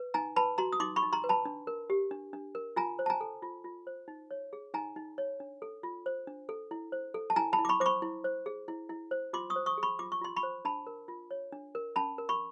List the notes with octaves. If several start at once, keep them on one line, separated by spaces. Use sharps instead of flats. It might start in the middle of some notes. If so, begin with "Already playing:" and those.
Already playing: B4
D#4 G#5 A#5
B4 A5 B5
F#4 A#5 C6
D#6
D#4 C6 D6
B5 C#6
D#4
A#5 C6
B4
A5 B5
D4
A#4
G4
D4
D4
A#4
F4 G#5 A#5
C5
A5
G#5 A#5
A4
F4
F4
C5
D#4
C#5
G#4
D#4 G#5 A#5
D#4
C#5
D4
A4
F4
C5
D4
A4
E4
C5
A4
A5
E4 G#5 A#5
A5 B5
E4
D6
B5 C#6
C5 D6
B5 C#6
E4
C5
G#4
E4
E4
C5
F4 C6 D6
C#6 D#6
C5
C#6 D#6
G#4
B5 C#6
F4 D6
C#6
F4 C6
B5 C#6
C5
D4 A5 B5
A#4
F4
C#5
D4
A#4
C#4 A5 B5
A#4
B5 C#6